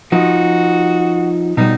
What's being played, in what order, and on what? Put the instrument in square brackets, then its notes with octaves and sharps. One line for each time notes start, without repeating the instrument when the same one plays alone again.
[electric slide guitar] F3 D#4 [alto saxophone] F#4
[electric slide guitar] B2 G3 [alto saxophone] D#4